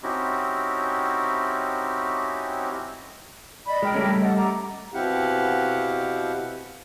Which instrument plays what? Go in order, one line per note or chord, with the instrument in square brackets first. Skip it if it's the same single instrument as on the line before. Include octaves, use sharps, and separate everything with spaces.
[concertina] C4 C#4 D#4 E4 F#4 G4
[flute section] D5 D#5 B5
[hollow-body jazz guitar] G#3 [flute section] A#4 G5
[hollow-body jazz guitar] G3 A3 C#4
[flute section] A4 D#5 F#5
A#5 D6
[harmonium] B2 C4 E4 G4 F5 F#5